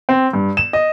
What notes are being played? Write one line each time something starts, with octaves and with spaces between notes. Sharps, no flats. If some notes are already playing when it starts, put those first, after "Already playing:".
C4
G2
E7
D#5